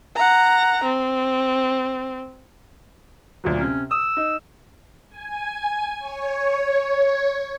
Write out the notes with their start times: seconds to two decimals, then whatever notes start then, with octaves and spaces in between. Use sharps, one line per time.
0.16 F#5 A#5
0.84 C4
3.44 D2 A#2 F#3
3.59 C3 C#4
3.91 D#6 E6
4.17 D#4
5.10 G#5
5.99 C#5